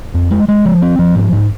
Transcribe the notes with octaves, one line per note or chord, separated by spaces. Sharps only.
F2
G#3
G#3
F3
C4
F3
G#2
G#2